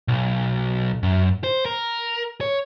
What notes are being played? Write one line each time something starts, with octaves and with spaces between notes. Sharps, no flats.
B1
F#2
C5
A#4
C#5